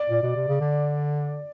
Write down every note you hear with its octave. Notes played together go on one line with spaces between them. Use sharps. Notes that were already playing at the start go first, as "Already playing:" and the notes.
Already playing: D5
A#2
B2
C3
C#3
D3